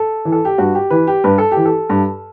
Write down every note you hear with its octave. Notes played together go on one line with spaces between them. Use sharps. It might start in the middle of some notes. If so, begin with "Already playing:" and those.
Already playing: A4
E3
A4
G4
G2 F#4
G4
E3 B4
G4
G2 B4
A4
G4
E3
A4
G2